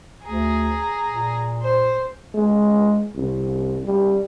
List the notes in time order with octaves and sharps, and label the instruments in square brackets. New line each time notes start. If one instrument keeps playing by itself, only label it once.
[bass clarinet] D2 [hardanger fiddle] G#4 A#5
[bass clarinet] A#2
[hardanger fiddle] C5
[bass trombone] G#3
C2
G3